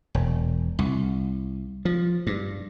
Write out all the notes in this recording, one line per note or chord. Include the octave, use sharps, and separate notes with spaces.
E1
C2
F3
G2